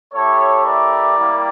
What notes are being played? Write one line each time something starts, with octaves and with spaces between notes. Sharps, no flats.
A3 E4 G4 A4 C#5
A#4 D5
G3 A#3 E4 G4